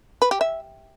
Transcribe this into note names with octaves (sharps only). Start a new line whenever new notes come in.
B4
G4
E5